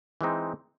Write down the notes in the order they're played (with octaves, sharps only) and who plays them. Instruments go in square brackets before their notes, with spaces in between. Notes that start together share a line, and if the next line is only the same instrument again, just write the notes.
[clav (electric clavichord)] E3 G#3 C4 D#4